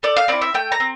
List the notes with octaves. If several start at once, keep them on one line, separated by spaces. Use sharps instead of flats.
A3 D5
F5
C4 E4 D5
E5
A3 G5
A#5
C4